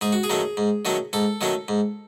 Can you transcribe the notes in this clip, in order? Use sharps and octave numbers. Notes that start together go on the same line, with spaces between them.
G#2 G#4
F#4
G#4
D#3 F#3 A3 C#4
G#2
D#3 F#3 A3 C#4
G#2 A4
D#3 F#3 A3 C#4
G#2